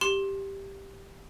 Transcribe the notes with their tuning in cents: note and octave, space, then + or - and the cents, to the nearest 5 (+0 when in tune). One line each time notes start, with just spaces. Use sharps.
G4 +0 C6 +25